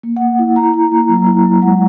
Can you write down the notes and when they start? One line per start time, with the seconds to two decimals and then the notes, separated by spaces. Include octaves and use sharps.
0.03 A#3
0.16 A#3 F#5
0.39 E4
0.56 E4 A#5
0.74 E4
0.92 A#3
1.09 F#3
1.27 E4
1.44 F#3
1.62 G#3 F#5